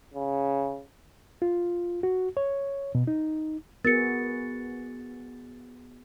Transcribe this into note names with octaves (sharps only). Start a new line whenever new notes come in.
C#3
F4
F#4
C#5
B2
D#4
B3 F#4 G#4 A#4 A6 C#7